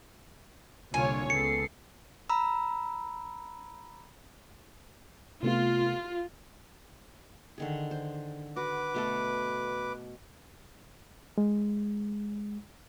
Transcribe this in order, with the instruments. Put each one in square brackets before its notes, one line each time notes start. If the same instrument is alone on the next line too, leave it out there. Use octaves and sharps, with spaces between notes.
[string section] C2 A#2 D3 [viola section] F4 C#5 [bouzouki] G#5
[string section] C#2 B3 C7 [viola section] A4 [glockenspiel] C#7
[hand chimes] A#5 B5 E6
[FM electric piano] C3 A3 B3 [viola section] F4
[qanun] D3 D#3 G#4
C5
[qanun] F#4 [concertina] B4 D6
[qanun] B2 A3 A4
[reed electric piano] G#3